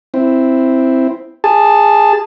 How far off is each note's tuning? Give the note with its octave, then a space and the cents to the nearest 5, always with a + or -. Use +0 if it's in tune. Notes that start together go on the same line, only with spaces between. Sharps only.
C4 +0 E4 +0
G#4 -15 A5 +0